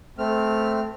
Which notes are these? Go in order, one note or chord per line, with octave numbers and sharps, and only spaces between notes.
A3 C4 F6